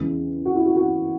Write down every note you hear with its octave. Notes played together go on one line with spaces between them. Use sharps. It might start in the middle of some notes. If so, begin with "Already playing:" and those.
Already playing: E2 C#3 E3 G#3
F#4
E4
F#4
F#4